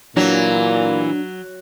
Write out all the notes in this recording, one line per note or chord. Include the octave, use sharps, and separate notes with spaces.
A#2 E3 F#3 D4